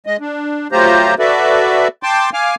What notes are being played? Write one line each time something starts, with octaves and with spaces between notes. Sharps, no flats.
G#3 D#5
D4
F#3 A3 F4 G4 C5 A#5
F#4 A4 B4 D5 E5
G5 A5 C6 D6
F5 G#5 D6 F6